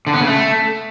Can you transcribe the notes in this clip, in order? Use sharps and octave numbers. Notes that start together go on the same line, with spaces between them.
D3
B3
C#3
A3